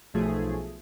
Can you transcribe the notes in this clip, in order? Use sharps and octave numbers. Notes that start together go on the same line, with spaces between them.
B1 F3 A3 G#4